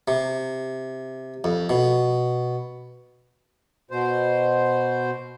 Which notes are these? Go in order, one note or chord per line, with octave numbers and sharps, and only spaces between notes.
C3
F2
B2
B2 C5